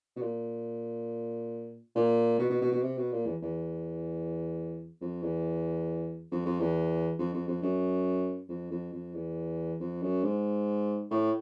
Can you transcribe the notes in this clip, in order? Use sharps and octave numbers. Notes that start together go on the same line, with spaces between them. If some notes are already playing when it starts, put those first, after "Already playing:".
B2
A#2
A#2
B2
B2
B2
B2
C3
B2
A#2
E2
E2
F2
E2
F2
F2
E2
F2
F2
F2
F#2
F2
F2
F2
E2
F2
F#2
G#2
A2